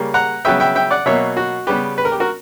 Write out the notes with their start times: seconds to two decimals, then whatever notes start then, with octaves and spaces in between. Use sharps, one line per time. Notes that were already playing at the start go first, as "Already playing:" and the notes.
Already playing: C#3 G3 A#3
0.14 F#5 A#5
0.45 C#3 F#3 B3 E5 G5
0.60 E5 G5
0.75 E5 G5
0.91 D5 F#5
1.06 B2 F#3 A#3 C#5 E5
1.37 F#4
1.67 C#3 G3 B3 G4 B4
1.98 B4
2.05 A#4
2.12 G4
2.20 F#4 A#4